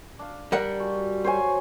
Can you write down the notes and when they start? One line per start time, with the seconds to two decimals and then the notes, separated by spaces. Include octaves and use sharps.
0.19 D4 F5
0.52 G3 A#4 F#5
0.80 G#3 F#4
1.24 F#3 C5 C#5 G#5 C#6